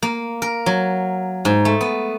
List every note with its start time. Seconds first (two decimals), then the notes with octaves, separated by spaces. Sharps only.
0.03 A#3
0.42 A#4
0.66 F#3
1.45 G#2
1.65 A3
1.81 B3